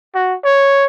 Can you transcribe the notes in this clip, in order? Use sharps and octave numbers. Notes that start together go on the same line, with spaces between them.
F#4
C#5